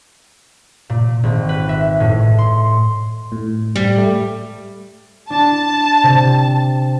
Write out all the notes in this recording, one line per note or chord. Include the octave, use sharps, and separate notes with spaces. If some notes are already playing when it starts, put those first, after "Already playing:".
A#2
G#1
B4
E5
A2
C6
A2
G3
A3
D4 A5
C3